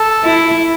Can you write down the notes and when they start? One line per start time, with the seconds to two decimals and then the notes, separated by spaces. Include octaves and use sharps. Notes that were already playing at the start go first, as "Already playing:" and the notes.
Already playing: A4
0.24 E4